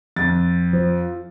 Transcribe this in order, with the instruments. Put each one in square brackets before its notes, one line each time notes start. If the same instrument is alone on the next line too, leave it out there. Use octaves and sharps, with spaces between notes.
[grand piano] F2 A6
[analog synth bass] F3